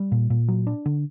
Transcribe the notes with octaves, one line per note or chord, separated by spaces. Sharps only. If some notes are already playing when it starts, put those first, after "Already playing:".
Already playing: G3
A#2
A#2
F#3
D4
D3